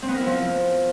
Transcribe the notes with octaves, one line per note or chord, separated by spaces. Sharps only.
C4
B3
A#4
E4
F3